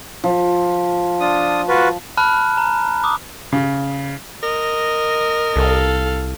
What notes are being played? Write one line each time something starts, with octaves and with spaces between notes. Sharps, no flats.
F3
D4 F4 D#6
F4 F#4 B4
A5 B5 F6 F#6
A#5
D6 D#6
C#3
A#4 D#5
C2 A4 F5